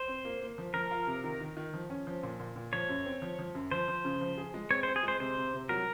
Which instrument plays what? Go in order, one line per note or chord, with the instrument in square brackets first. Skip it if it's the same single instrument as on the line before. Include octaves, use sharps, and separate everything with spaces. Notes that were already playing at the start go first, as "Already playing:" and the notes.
Already playing: [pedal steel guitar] C5
[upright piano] C4
A#3
A#3
F3
[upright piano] F3 [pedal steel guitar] A#4
[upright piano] F4
C3
D#3
D#3
D#3
F3
C#4
F3
A#2
A#2
A#2
[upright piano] F3 [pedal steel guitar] C#5
[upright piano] F#2
C4
F3
F3
F#2
[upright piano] F3 [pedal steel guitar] C5
[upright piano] F3
C#3
F3
G#4
G#3
[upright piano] C4 [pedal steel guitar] C#5
[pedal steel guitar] C5
[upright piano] C4
[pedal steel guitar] G#4
[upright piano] G#3 [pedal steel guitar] C5
[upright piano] C3 [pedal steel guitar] C5
[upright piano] C3
C3
[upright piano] F#3 [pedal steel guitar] A#4